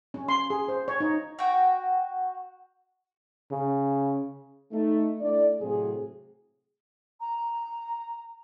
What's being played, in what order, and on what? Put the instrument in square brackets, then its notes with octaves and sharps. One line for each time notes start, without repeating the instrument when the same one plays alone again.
[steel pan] C#4
C6
G#4
C5
C#5
D#4
[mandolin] F#4 G5
[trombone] C#3
[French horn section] A3 D#4
A3 D4 E4 D5
A2 C3 F#3 G#4
[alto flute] A#5